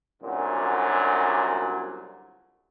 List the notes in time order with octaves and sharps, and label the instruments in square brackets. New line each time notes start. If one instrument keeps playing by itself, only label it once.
[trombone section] C2 F#2 A#2 D3 F#3